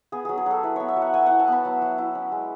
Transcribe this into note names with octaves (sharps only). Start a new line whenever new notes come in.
B3 G#4
F#3 G#4
G#4
F#3 A4
E4 B4
B3 C#5
E5
F#3
F#5
F#3 G#5
E4 F#5
A5
B3 B5
F#3
F#3
E4
C#4
G#3